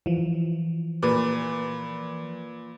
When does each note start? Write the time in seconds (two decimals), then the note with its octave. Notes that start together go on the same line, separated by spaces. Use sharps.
0.06 E3 F3
1.03 A#2 B4